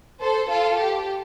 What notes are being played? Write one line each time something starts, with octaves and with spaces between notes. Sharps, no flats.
A4 C5
F4 A4
G4